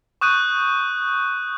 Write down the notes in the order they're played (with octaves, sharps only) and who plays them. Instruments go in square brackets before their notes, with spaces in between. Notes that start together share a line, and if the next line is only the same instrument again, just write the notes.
[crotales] C#6 D#6 F#6 G6 D#7